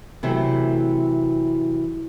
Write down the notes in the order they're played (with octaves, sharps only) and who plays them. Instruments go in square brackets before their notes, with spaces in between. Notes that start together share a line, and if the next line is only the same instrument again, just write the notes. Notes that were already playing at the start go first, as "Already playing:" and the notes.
[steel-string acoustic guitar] C3 E3 F#3 A3